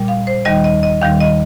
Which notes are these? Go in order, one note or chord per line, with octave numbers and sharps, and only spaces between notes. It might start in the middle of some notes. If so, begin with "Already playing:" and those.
Already playing: A#2 G3
F5
C5
D#2 D#3 G3 D#5
D#5
D#5
D#2 D#3 G3 F5
D#5